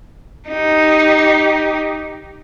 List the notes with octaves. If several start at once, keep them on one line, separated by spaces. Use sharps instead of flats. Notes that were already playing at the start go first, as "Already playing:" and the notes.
D#4 G4